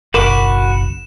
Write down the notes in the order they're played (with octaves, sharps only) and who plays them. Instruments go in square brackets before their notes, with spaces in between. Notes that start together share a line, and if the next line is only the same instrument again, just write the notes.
[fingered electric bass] F#1 B1 [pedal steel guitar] F#4 B5 D6 [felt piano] A#4 [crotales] E7